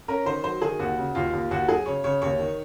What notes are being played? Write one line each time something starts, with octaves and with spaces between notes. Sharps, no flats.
C#4 A#4
D#3 C5
F#3 C5
D#3 G#4
D#2 F#4
C#3
D#2 F4
D#2
D#2 F#4
F#3 G#4
C#3 C#5
C#3 C#5
D#2 C#5
D#3